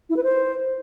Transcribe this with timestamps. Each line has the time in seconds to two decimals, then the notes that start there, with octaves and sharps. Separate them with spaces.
0.10 E4
0.17 B4
0.24 C5